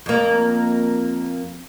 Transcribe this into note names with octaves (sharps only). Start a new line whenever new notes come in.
F2 A#3